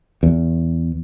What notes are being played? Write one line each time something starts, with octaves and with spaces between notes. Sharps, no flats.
E2